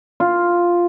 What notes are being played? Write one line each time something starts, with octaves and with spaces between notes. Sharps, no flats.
F4